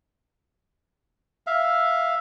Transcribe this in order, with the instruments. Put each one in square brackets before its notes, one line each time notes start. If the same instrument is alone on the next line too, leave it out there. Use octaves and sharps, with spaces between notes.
[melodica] E5 F5